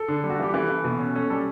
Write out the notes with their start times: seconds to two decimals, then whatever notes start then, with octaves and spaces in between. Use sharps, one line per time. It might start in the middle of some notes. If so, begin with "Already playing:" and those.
Already playing: A4
0.08 D3
0.24 G3
0.30 F#4
0.39 E3 G4
0.54 E3 A4
0.70 E3
0.85 B2
0.99 C#4
1.15 C#4 A4
1.30 G3 A4